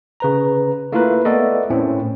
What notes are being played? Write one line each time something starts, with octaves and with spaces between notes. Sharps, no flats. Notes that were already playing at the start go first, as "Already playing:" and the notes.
C#3 B4 A#5
A3 A#3 E4 F4 A#4 B4
A3 B3 A4 A#4 D5 D#5
A2 C4 C#4 E4